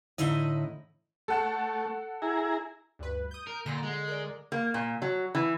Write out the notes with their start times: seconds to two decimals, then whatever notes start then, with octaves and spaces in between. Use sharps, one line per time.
0.18 A2 D3 D#4 E4 D#5
1.28 A3 A4 F#5 A5
2.22 E4 G#4 A#5
2.99 D2 G2 B4
3.31 D#6 G6
3.47 A#4
3.66 A#2 D3 A#6
3.83 G#3
4.07 A#4 D5
4.52 A#3
4.74 A#2
5.02 F#3
5.35 E3